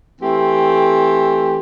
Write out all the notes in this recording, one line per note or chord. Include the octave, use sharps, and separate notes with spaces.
E3 A3 C4 G4